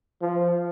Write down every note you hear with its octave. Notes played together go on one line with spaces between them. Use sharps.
F3